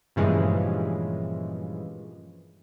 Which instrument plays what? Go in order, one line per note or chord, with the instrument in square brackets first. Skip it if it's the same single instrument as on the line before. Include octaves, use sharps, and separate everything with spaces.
[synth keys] G2 A#2 C#3 E3 F3 G#3